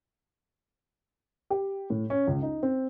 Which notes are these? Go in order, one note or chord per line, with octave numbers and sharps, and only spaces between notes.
G4
A2
C#4
C#2
D#4
C4